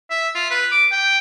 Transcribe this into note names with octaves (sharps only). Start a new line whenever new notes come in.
E5
F4
B4
D6
G5